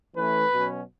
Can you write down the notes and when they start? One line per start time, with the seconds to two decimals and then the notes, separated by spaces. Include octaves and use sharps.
0.16 E3 A3 C#4 B4
0.52 B2 F#3 C#4